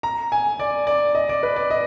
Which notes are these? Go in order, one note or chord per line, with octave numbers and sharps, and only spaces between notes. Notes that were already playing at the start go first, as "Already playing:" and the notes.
A#5
G#5
D5
D5
D#5
D5
B4
D5
D#5